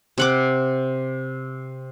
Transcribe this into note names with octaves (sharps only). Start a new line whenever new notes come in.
C3 F#5 D6